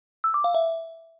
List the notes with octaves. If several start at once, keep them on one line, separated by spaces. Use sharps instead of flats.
E6
D6
F5
E5